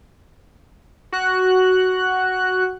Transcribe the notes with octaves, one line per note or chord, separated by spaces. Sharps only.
F#4 F#6